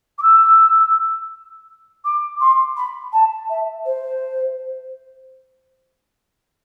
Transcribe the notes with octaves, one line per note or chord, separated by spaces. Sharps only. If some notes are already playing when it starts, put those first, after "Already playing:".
D6
E6
D6
C6
B5
A5
E5
C5